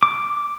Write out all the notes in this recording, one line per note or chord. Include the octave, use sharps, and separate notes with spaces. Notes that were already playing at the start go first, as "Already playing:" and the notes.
D6